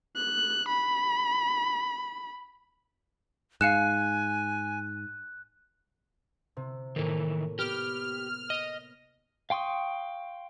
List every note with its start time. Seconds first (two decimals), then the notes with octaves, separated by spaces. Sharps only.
0.16 F#6
0.69 B5
3.61 G#2 F5 G#5 F#6 C#7 E7
6.57 C3
6.96 A2 D#3 E3 A#3
7.59 B3 G4 F6
8.50 D#5
9.50 F5 G5 C6 C#6 D#6